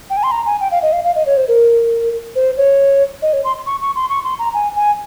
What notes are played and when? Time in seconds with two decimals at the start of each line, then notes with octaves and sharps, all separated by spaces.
0.10 G5
0.17 G#5
0.23 C6
0.31 A#5
0.46 G#5
0.60 G5
0.71 F5
0.82 D#5
0.93 F5
1.04 F5
1.15 D#5
1.26 C#5
1.37 C5
1.48 A#4
2.35 C5
2.57 C#5
3.22 D#5
3.33 C#5
3.44 C6
3.66 C#6
3.81 C#6
3.96 C6
4.10 C#6
4.24 C6
4.39 A#5
4.54 G#5
4.76 G#5